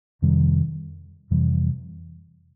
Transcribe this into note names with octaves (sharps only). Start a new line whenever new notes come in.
F2 C3 D#3 G3
F2 C3 E3 G3